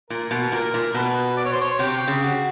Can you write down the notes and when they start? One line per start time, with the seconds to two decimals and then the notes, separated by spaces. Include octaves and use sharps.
0.10 A#2 A#4
0.31 B2
0.52 A#2 A#4
0.74 A#2
0.94 B2 B4
1.37 D5
1.45 C#5
1.53 C5
1.61 C#5
1.79 C3 G4
2.08 C#3
2.22 F#4